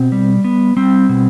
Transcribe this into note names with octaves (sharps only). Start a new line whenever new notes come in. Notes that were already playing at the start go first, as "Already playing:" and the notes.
Already playing: B2 C4
G3
B3
G3 C4
B2